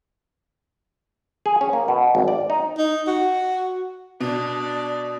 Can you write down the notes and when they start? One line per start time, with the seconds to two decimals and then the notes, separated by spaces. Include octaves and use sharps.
1.46 G#4
1.61 C#4
1.73 A#3
1.88 B2
2.15 G#1
2.28 D5
2.50 D#4
2.78 D#4
3.07 F#4
4.21 B2 D4 D5